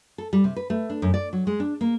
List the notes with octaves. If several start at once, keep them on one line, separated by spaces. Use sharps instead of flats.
A4
G3
C3
B4
A3
D4
F#2
D5
F#3
G#3
D4
A#3